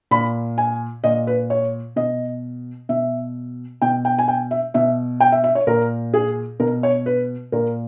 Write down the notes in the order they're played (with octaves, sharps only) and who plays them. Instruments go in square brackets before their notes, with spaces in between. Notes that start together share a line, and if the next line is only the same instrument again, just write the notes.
[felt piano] A#2 B5
G#5
A#2 D#5
B4
C#5
B2 D#5
B2 E5
B2 G5
G5
G#5
G5
E5
B2 E5
G5
E5
E5
C#5
A#2 A#4
G#4
B2 A#4
C#5
B4
A#2 A#4